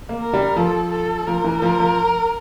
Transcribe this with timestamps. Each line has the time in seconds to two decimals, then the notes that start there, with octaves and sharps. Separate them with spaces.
0.09 A#3
0.21 A#4
0.33 G3
0.56 F3 A4
0.92 A4
1.27 F3 A#4
1.44 E3
1.62 F3
1.80 F3